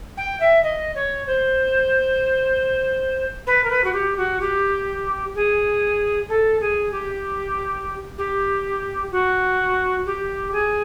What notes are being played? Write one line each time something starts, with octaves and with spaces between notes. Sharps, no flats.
G5
E5
D#5
C#5
C5
B4
A#4
B4
F#4
G4
F#4
G4
G#4
A4
G#4
G4
G4
F#4
G4
G#4